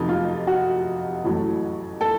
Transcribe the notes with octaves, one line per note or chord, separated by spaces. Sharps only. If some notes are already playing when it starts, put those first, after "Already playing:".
Already playing: F1 F2 C3 F#3 A3 D#4
F4
F#4
A1 A2 F#3 A3
A4